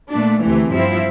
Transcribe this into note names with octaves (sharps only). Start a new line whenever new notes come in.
A#2 A3 D4
D2 C3 E3 A3
G2 F3 C4 E4